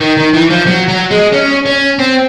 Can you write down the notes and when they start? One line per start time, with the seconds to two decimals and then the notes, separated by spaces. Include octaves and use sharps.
0.01 D#3
0.17 D#3
0.33 E3
0.50 F3
0.67 F#3
0.88 F#3
1.11 G#3
1.33 C#4
1.66 C#4
1.99 C4